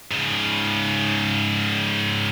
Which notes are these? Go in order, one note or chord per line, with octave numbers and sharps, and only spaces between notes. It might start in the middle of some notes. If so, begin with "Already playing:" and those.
G#2 C#3